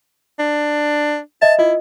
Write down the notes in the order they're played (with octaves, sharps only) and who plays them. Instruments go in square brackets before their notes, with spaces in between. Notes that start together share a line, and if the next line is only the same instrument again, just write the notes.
[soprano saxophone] D4
[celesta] D#5 E5 [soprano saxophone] A5
[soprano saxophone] E4 [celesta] F4 D#5